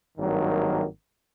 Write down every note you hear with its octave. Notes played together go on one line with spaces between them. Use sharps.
G#1 G2 D#3 F#3 A#3